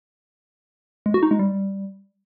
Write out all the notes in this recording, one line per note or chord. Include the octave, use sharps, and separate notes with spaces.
G#3
F#4
D#4
G#3
G3